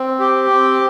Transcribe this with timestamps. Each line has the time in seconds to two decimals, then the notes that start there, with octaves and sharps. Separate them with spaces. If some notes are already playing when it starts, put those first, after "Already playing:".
Already playing: C4
0.20 G4
0.50 C4